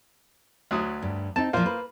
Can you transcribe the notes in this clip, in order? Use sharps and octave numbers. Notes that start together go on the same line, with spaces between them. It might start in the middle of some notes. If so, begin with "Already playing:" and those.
D2 F#3 D#6
G2
C4 D#4 A5
A#2 F3 A#3 F4 C5
B4